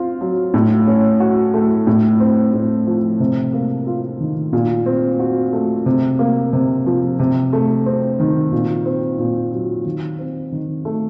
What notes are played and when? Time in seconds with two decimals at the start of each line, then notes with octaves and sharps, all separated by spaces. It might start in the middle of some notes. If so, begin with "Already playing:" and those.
Already playing: C4 F4
0.21 F#3
0.54 A2
0.87 C#4
1.20 F#4
1.54 A3
1.87 A2
2.20 C4
2.54 A2
2.87 F3
3.20 C3
3.53 A#3
3.87 F4
4.20 D#3
4.53 A#2
4.86 C4
5.19 F#4
5.53 A3
5.86 C3
6.19 A#3
6.53 C3
6.86 F3
7.20 C3
7.53 A3
7.86 C4
8.20 D#3
8.52 A#2
8.86 C4
9.19 A#2
9.52 F#3
9.86 D#3
10.19 C4
10.52 D#3
10.85 A3